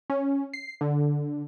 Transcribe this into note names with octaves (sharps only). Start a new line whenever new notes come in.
C#4
C7
D3